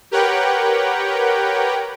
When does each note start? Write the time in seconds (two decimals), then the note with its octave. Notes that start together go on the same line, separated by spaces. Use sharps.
0.11 G4 A#4 B4 C#5 F#5 G5